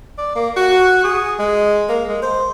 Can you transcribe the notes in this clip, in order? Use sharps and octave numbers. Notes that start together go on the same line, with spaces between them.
D5
A#3
F#4
G#4
G#3
A#3
G#3
C5